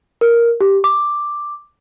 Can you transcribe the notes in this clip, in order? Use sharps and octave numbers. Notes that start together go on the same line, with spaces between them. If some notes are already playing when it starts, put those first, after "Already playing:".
A#4
G4
D6